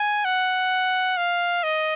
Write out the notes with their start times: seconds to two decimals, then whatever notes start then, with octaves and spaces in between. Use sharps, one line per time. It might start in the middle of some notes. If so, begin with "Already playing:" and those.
Already playing: G#5
0.25 F#5
1.17 F5
1.64 D#5